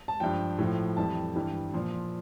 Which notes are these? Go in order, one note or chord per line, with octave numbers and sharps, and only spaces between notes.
A5
G2 F3 G5
A2 F3
F2 E3 G3 A5
G2 E3 G3
A#2 F3